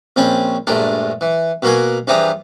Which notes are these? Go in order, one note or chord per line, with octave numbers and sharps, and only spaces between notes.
A#1 C4 C#4 A5 B5
A#1 G2 G#3 A3 A#4 A5
E3
B2 A#3 F#4 A#4 G#5
G2 E3 F3 G4 G#4 A#5